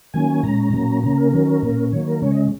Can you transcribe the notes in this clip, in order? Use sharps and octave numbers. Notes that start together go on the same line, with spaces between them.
D#3 F#3 A#3 C#4 G#5
A#2 G#3 C#4 A#5
A#2 F#3 A#3 C#4
C#3 A#3 C#4 A#5
A#4
D#3 F#3 C#4
A#2 A#3 C#4
D#3 F#3 A#3 C#5
A#4
C#3 G#3 C#4 C#5
D#5